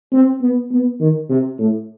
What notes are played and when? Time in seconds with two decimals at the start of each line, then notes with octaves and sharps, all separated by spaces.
0.12 C4
0.42 B3
0.71 B3
1.00 D#3
1.29 C3
1.59 A2